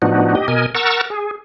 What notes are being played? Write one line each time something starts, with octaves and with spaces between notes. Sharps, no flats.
A2 F3 B3 D4 D#4 F#4
G4 D#5
B2 A#4 D#5 G#5
A#4 F#5 A#5 C#6 E6 A6
G#4